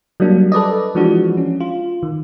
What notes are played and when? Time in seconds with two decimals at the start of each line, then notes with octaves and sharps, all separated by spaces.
0.20 F#3 G3 A#3 D4
0.52 A4 B4 D5 D#5
0.95 E3 F3 G#3 D4 F#4
1.37 C#4
1.60 F4
2.03 D#3